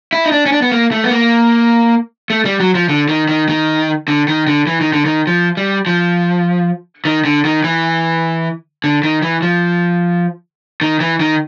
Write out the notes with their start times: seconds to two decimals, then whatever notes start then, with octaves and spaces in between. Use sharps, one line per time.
0.13 E4
0.26 D#4
0.32 D4
0.46 C#4
0.52 D4
0.62 B3
0.72 A#3
0.92 A3
1.04 B3
1.11 A#3
2.30 A3
2.45 G3
2.60 F#3
2.75 F3
2.89 D3
3.09 D#3
3.29 D#3
3.49 D#3
4.08 D3
4.28 D#3
4.47 D3
4.67 E3
4.81 D#3
4.93 D3
5.05 D#3
5.27 F3
5.57 G3
5.87 F3
7.05 D#3
7.25 D3
7.45 D#3
7.64 E3
8.84 D3
9.04 D#3
9.22 E3
9.42 F3
10.81 D#3
11.01 E3
11.20 D#3